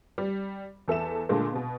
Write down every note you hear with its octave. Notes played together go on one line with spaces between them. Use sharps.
G3
E2 A4 E5 E7
A#2 D3 G#3 A3
B2 B3